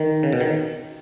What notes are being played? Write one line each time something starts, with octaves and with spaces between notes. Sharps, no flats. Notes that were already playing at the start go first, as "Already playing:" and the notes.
Already playing: D#3
C#3
B2
D#3